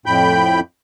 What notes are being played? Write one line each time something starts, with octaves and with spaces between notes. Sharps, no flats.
F2 A2 G5 B5 G6